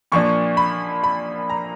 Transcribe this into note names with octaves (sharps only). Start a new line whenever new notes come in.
A#2 F3 A#3 D4 C#6
B5
B5
A#5